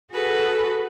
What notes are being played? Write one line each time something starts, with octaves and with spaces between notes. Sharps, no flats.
F#4 G#4 A4 B4